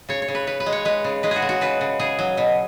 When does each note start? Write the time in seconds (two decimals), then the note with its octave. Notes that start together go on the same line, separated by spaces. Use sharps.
0.09 C#3 C#5
0.22 C#5
0.28 C#3
0.35 B4
0.47 C#3 B4
0.60 B4
0.66 G#3
0.72 C#5
0.85 G#3 B4
1.04 C#3
1.23 G#3 B4
1.31 F#4 G#4
1.42 C#3
1.49 F#4
1.61 C#3 B4
1.81 C#3
1.99 C#3 G#4
2.19 F#3
2.37 B2